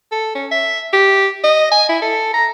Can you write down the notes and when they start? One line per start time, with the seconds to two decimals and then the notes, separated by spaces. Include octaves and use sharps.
0.12 A4
0.35 C#4
0.51 E5
0.93 G4
1.44 D#5
1.71 G#5
1.89 E4
2.02 A4
2.34 A#5